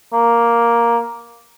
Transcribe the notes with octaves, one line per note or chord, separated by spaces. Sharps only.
A#3